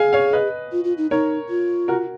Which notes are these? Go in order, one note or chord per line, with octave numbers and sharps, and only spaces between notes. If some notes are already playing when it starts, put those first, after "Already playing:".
Already playing: G#4 F5 G#5
C#5 F5
B4 D#5
F4
F4
D#4
D#4 A#4 C#5
F4
F#4 A#4